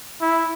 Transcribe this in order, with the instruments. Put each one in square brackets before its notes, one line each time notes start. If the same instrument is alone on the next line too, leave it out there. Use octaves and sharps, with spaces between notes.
[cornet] E4